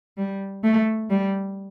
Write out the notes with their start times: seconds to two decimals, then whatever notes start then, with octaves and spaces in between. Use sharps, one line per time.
0.17 G3
0.64 A3
1.10 G3